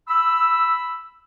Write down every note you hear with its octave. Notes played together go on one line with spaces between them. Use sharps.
B5 E6